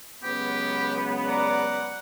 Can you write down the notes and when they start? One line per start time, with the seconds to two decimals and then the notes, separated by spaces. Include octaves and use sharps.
0.23 C#2 F#3 B3 G4
1.27 D5 F#5 A#5